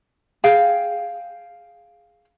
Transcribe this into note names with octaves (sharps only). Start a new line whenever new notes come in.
G#4 F5 G5